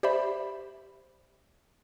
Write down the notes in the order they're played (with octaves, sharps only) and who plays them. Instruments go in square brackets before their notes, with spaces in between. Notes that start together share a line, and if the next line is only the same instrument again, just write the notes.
[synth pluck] G4 C5 D5 E5 B5